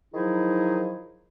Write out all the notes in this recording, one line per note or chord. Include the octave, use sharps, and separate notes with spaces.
D#3 F3 F#3 D#4 E4 G#4